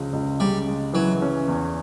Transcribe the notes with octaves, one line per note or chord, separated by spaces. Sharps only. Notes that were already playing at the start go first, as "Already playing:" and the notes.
Already playing: C#2 C#3 F3
C#2
C#3 G3
G#3
E3 F#3
C#4
E2